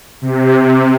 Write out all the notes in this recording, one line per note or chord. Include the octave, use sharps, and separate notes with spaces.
C3